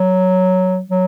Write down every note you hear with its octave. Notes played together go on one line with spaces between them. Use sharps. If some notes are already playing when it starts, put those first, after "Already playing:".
Already playing: F#3
F#3